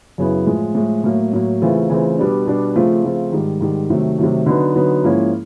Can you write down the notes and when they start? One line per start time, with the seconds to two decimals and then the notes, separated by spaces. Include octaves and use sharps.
0.18 F#2 C#3 F#3 B3 E4
0.46 A2 F3 G#3
0.75 A2 F3 G#3
1.04 A2 F#3 A#3
1.33 A2 F#3 A#3
1.62 C#3 E3 A3 C4 F4
1.90 C#3 E3 A3 C4 F4
2.18 B2 G3 B3 D4
2.47 B2 G3 B3 D4
2.75 C#3 F3 A3 C4 F4
3.04 C#3 F3 A3 C4 F4
3.32 G#2 D#3 G3
3.61 G#2 D#3 G3
3.90 C3 D#3 F#3 A3
4.18 C3 D#3 F#3 A3
4.46 D3 F#3 B3 D#4
4.75 D3 F#3 B3 D#4
5.04 G#2 F3 A#3 C#4 E4